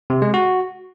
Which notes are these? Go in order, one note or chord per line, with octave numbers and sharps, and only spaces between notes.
C3
G#3
F#4